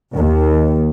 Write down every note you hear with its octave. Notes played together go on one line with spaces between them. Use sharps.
D#2